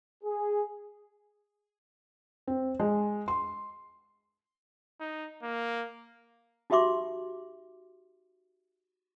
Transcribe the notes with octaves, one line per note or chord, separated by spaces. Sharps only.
G#4
C4
G#3
C6
D#4
A#3
D#4 F#4 G4 E5 C6 D6